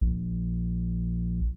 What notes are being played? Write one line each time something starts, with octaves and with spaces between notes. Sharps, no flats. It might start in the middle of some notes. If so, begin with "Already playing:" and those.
A#1